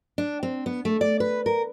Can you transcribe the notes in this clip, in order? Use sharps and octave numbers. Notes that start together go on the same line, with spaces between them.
D4
C4
B3
A3
D5
B4
A#4